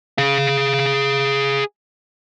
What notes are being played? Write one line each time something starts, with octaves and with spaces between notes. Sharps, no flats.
G#4 F5